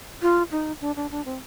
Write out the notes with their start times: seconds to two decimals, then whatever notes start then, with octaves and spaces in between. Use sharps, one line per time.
0.22 F4
0.51 D#4
0.81 D4
0.96 D4
1.11 D4
1.25 C4